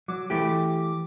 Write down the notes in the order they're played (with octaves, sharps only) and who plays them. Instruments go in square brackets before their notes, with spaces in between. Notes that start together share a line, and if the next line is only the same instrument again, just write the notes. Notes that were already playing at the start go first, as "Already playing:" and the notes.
[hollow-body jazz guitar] F#3 [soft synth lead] D6
[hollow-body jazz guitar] E3 A3 G4